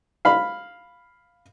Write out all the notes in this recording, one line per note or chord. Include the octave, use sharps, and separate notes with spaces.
F5 B5